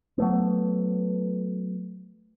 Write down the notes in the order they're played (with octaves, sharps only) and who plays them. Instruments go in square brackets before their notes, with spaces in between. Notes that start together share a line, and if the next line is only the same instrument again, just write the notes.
[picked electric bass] F#3 A3 B3